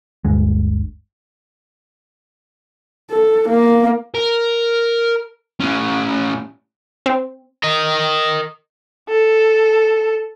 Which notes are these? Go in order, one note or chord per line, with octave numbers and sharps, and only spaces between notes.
G1 D2 D3 G#3
A4
A#3
A#4
A2 C#4
C4
A#4 D#5
A4